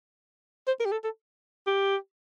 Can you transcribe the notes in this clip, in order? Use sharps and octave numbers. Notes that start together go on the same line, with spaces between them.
C5
A#4
G4
A4
A4
G4